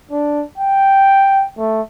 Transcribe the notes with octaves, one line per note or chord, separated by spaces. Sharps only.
D4
G5
A3